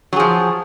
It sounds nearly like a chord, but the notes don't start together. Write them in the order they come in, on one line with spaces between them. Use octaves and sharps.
F#3 G#4 F3